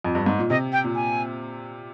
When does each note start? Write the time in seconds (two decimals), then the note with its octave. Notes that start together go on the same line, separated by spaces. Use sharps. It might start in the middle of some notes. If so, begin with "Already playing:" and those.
0.04 F2
0.15 G2
0.26 G#2
0.39 A#2
0.50 C3 D#5
0.73 G5
0.84 A#2
0.95 G#5